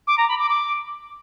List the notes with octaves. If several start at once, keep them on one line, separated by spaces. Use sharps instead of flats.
D6
A#5
B5
D6
D6